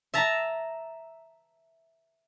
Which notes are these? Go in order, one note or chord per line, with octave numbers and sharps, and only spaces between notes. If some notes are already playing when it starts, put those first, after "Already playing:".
E5 A5 A#5